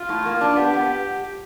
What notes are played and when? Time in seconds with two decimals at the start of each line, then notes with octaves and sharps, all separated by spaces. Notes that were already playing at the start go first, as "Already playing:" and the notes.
Already playing: F4
0.09 A2
0.26 A#3
0.41 D4
0.57 B3 G4
0.73 B3